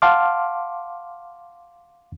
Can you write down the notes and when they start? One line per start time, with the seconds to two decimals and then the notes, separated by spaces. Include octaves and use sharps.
0.02 F5 F#5 A5 C6 D6 F6